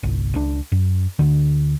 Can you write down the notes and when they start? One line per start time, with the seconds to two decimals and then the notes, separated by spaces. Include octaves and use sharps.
0.03 G1 C2
0.35 C#2 D4
0.72 F#2
1.19 D2 D3